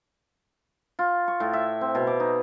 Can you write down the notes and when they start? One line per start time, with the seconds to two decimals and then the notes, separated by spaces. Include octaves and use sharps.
0.99 F4
1.28 C#6
1.40 A2
1.53 E5
1.81 C4
1.95 B2
2.07 D6
2.20 D#4